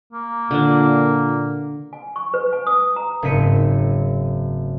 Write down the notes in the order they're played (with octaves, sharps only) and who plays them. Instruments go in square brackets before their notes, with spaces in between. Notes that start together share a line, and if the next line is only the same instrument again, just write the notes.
[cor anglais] A#3
[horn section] A#2 [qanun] D3 D4
[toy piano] G#5
C#6
B4
G#5
D#6
A#5
[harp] F#1 G#2 C4 B6 C#7 D#7